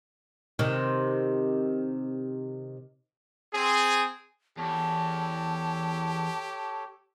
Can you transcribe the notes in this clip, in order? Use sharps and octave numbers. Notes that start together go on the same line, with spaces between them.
C3 D#3
C4 G#4
E2 G4 A4 C#5 A5